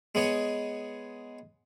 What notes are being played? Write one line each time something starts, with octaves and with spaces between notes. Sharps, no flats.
G#3 B3 C#5 D#5